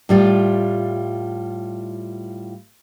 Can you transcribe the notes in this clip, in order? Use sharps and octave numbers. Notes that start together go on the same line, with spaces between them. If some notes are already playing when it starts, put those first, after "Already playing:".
A2 G3 F4